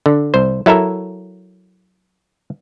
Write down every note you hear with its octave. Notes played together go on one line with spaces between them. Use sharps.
D3
C2 C5
F#3 E4 A4 A#4 E5